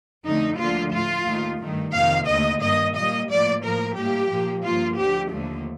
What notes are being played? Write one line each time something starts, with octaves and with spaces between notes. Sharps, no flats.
F2 D3 A3 D#4
D2 D3 F3 A#3 F4
A2 A3 F4
D#2 D#3 A3
G2 D#3 A3
F2 C3 D#3 A#3 F5
D#2 D3 A3 D#5
G2 D#3 A#3 D#5
A#2 G3 A#3 D#5
A2 F3 A#3 D5
A2 F3 A#3 A#4
A2 G3 A#3 G4
A#2 F3 A#3
G2 F3 A#3 F4
D2 D3 F3 G4
D#2 D3 F3 A3